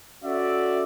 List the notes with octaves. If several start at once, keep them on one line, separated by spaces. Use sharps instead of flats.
C#4 F#4 A4 D5 E5